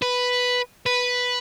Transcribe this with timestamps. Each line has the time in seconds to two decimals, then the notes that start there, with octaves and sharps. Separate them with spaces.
0.02 B4
0.86 B4